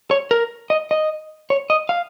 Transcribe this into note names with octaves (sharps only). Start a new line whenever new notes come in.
C#5
A#4
D#5
D#5
C#5
D#5
F5